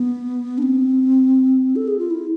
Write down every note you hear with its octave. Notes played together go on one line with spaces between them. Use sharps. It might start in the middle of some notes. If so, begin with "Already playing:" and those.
Already playing: B3
D4
C4
A4
G#4
F4
E4